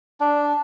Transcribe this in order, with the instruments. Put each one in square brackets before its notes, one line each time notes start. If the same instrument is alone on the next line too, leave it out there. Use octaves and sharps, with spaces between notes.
[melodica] D4